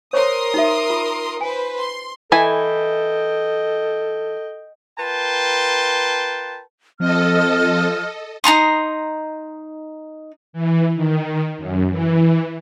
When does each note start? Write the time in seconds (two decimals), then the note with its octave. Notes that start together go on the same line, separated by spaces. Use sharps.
0.13 A#4 C5 C#5 C6 C#6 D#6
0.54 D#4 F#4 E5
0.90 F4
1.41 B4 C5 G#5
1.78 C6
2.32 E3 E4 A4 D#5 G5 G#5
4.99 F4 A#4 B4 G5 A5 C6
7.00 F3 C4 A4 D#5 F6
8.44 D#4 A#5 C6 D#6
10.53 E3
10.95 D#3
11.58 F#2
11.90 E3